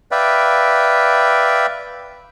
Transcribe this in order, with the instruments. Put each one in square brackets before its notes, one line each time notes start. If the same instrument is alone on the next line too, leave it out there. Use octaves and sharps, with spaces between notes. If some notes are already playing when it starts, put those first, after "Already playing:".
[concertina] B4 D5 E5 F5 G5